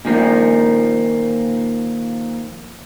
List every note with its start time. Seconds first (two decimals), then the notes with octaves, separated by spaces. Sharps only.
0.05 A#2 D#3 F3 A#3